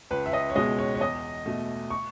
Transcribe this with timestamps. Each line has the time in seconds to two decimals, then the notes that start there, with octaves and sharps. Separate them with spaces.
0.11 C#2 B4
0.26 E5
0.33 D#5
0.50 C#5
0.56 B2 G#3 D#5
0.79 C#5
0.95 C#5
1.00 E2 D#5
1.46 B2 A3
1.90 C#6